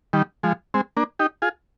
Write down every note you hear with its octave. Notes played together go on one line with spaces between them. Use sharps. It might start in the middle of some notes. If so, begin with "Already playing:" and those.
D#3 G3
F3 G#3
G#3 C4
A#3 D4
D#4 G4
F4 G#4